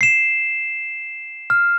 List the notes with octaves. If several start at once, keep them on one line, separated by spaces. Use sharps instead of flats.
C7 E7
F6